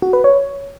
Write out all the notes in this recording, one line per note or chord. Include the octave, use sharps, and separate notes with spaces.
F#4
B4
C#5